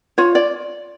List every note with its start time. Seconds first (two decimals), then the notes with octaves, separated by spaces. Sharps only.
0.18 F4 C#5
0.35 D5